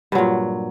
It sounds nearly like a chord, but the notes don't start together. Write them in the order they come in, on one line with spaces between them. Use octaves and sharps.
G2 F#3 A#2